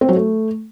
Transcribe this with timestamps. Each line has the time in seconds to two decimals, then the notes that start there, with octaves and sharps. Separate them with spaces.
0.01 C4
0.09 F#3
0.16 A3